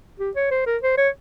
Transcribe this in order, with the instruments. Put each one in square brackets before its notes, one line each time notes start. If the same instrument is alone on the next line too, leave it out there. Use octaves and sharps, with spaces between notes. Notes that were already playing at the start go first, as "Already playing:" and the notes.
[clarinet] G4
C#5
C5
A#4
C5
C#5